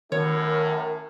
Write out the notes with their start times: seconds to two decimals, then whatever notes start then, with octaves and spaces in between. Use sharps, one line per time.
0.12 F#2 A2 D#3 A#4 C#5